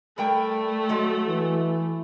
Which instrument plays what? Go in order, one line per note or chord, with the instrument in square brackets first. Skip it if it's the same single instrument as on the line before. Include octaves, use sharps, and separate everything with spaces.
[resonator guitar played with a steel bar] G3 A#4 G5 [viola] A3
[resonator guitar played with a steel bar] F#3 G#3
[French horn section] E3